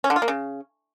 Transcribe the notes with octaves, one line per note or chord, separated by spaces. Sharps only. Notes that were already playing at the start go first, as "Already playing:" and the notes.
C#4
D3
F4
A#3
C#3